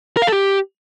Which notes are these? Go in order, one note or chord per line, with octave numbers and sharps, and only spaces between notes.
A#4
F5
A4
G4